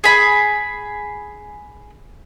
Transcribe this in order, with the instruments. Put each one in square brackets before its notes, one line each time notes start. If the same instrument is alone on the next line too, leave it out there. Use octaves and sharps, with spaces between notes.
[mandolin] G#4 B5